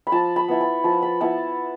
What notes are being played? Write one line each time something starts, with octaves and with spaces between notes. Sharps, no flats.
B5
F3 A5
B5
B3 E4
A5
F3 A5
B5
B3 E4 A5